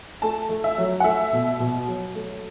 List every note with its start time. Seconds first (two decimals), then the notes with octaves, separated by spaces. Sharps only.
0.22 A3 A5
0.49 A3
0.64 E5
0.78 F#3
1.00 F#5
1.04 A3 E5
1.33 B2
1.60 B2
1.88 F#3
2.15 A3